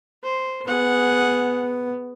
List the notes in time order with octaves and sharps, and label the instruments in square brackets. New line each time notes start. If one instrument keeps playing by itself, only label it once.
[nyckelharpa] C5
[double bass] B3 [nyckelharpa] G#4 F#5